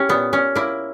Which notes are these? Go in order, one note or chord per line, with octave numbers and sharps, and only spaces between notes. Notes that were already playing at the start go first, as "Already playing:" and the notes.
Already playing: C#4 E4 G4
A#2 B3
A#2 C#4
A#3 E4